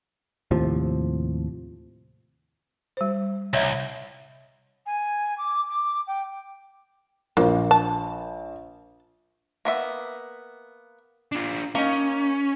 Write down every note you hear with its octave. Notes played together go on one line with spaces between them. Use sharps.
D#2 A2 C3 F3
G3 C5
C2 C#5 D#5 E5
G#5
D6
D6
G5
A#1 A#3
A5
A#3 B3 E5
D4 F4
A#3 C#4 D#4